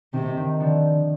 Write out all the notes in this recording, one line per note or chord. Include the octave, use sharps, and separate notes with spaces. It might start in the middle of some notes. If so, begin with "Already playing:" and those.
C3 D#3
D#3
D3 F3